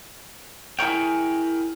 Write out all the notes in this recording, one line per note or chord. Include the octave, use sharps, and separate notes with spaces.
E4 G#4 A#4 C#5 G5